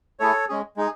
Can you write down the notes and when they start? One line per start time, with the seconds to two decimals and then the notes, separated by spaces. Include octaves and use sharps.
0.20 A3 E4 G#4 A4 C#5
0.48 G#3 C#4 G#4
0.77 G#3 D#4 G#4